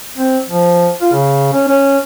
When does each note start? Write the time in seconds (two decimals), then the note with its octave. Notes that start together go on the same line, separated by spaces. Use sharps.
0.18 C4
0.49 F3
1.01 F4
1.13 C#3
1.53 C#4
1.68 C#4